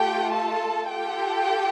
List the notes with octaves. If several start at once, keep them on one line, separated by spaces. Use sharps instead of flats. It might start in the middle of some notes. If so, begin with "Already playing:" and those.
Already playing: A3 F4 G4 A4 G5
A4 A5
F4 G4 A4 G5